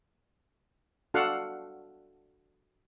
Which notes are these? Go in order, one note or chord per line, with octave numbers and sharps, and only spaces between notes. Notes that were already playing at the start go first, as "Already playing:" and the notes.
D4 F#4 A4 F5 F#5